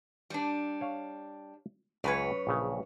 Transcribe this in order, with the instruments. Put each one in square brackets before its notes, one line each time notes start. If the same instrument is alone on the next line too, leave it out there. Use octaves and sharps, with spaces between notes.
[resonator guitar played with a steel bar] G3 D4
[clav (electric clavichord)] C#5 F5
[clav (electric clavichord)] C#2 G#5 [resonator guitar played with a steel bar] F#2 B4 C#5
[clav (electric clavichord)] A#1 C#3